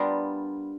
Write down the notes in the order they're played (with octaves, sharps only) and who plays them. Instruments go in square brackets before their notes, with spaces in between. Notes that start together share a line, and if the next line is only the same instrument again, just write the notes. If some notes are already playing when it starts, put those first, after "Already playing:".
Already playing: [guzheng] G3 B3 D4 F4 A#4